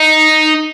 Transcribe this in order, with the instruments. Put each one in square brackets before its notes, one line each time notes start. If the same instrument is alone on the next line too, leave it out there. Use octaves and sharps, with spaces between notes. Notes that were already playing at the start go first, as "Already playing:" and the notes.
Already playing: [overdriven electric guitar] D#4